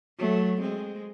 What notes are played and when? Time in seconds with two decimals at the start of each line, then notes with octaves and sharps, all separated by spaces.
0.18 F#3 A3
0.60 G#3 C4